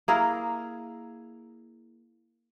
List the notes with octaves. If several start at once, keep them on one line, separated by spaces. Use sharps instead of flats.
A#3 E4 G#4 A#4